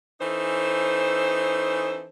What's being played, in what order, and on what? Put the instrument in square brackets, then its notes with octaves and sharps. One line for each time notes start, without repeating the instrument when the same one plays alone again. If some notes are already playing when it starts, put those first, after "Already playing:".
[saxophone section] E3 C#4 D#4 A4 C5